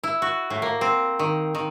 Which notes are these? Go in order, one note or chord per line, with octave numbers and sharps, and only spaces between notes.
E4
F#4
A2
A#3
C4
D#3
D#3